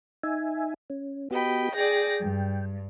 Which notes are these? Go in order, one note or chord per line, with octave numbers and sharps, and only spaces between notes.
D#4 E5 G#5
C#4
B3 F#4 G4 D#5 G5 B5
G#4 D5 G5 A#6
G2